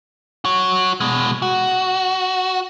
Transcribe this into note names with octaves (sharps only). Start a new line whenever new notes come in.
F#4 C#5
B2 G#3
F#4